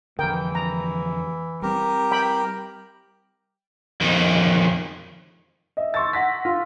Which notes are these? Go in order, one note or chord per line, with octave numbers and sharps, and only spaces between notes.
F2 D3 E3 A#4 G5
A#5
G3 C4 G4 A#4
G5 B5
F2 D#3
D#5 E5
C6 C#6 E6 A6
F#5 A#6 B6
F4